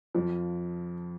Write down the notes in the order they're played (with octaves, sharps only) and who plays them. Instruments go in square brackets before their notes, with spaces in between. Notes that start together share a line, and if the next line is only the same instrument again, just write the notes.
[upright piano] F2 F3